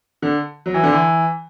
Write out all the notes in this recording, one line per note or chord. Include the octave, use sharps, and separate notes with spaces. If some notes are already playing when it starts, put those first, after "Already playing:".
D3
F#3
E3
D3
E3